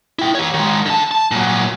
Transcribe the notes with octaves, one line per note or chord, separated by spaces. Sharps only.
E4 G5
G4 C#5
D#3 G#3
D3 A5
A5
A#2 F#3